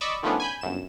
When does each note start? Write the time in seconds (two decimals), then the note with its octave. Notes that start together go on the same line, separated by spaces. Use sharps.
0.01 D5 D#5 B5 C#6 D6 E6
0.23 D#3 F3 A3 B3 C#4 D4
0.40 G#5 B5 G6
0.61 G1 F#2 E7